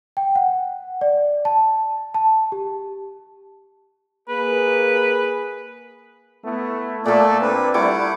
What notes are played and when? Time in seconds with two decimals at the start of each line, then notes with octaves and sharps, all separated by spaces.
0.17 G5
0.35 F#5
1.01 D5
1.45 A5
2.14 A5
2.52 G4
4.29 A#3 G#4 B4
6.44 A3 B3 E4
7.06 A#2 A3 A#3 A4 D5
7.42 C4 D4 B4
7.74 G3 A3 E4 F#5 D6